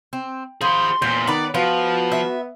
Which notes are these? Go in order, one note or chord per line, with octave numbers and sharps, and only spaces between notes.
C4
F3 G#4 B5 C6
E2 A#2 C5
D#3 B3 B4 D5
F3 B3 F4 F#4
E5